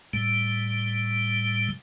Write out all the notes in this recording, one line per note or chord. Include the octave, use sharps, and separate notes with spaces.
A2 G3